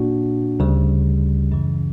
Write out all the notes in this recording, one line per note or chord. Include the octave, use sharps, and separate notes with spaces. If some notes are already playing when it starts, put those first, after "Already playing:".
Already playing: A#2 A#3 D4 F#4
D2 C#3 G3
F#2 C#3 E3